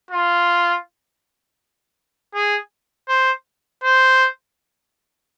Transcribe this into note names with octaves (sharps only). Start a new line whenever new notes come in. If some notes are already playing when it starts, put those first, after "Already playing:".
F4
G#4
C5
C5